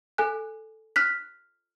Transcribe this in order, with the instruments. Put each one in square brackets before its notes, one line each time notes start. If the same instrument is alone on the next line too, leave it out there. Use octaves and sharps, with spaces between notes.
[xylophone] A4 G#5 F#6
F6 F#6 B6